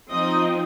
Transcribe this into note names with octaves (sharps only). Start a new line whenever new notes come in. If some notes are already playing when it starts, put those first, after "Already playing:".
F3 C4 D#4 D#5